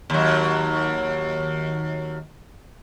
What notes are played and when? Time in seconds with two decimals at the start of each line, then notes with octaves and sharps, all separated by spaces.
0.10 D#2 F#3